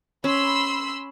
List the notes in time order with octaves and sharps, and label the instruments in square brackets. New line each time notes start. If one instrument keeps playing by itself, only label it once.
[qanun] C#4 [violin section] B5 C6 E6